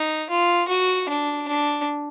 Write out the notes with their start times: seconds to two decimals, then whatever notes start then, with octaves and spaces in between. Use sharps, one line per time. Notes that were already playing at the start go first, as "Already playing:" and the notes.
Already playing: D#4
0.30 F4
0.68 F#4
1.09 D4
1.48 D4